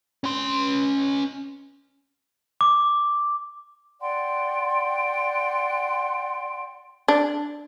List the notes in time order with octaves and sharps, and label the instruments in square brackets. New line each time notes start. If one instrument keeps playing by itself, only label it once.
[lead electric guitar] C#4 C6
[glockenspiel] D6
[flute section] D5 F#5 G5 C6
[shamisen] D4